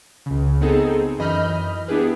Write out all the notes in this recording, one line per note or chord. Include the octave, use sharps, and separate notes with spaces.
C#2 C#3
B3 C4 D#4 G#4 A4
F#2 E3 D#5 B5 F6 G6
B3 D4 E4 G4 G#4 B4